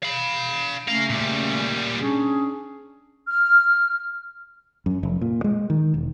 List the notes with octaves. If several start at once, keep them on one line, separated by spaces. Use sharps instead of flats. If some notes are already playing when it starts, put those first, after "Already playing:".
F5 B5
C#3 A3 C#4 A#4 F5
A#2 G3
C#4 D4 G#4
F6
F#2
F1
A#2
G#3
D#3
E1